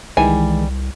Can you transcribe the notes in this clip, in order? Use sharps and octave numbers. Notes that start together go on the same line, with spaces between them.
C2 D#3 E3 G3 G#3 G#5